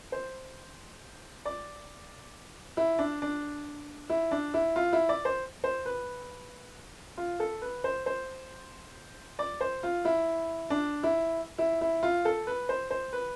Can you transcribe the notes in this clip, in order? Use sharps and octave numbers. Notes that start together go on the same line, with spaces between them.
C5
D5
E4
D4
D4
E4
D4
E4
F4
E4
D5
C5
C5
B4
F4
A4
B4
C5
C5
D5
C5
F4
E4
D4
E4
E4
E4
F4
A4
B4
C5
C5
B4